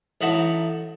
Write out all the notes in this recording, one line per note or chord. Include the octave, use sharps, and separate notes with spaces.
A1 D#4 E4 F#4 A5